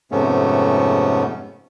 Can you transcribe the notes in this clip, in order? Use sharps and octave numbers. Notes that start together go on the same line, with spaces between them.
F2 G#2 C3 A3 B3 C#4